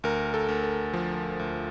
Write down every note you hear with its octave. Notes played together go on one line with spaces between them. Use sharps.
D2 A#4
A4
D2
A4
F3
D2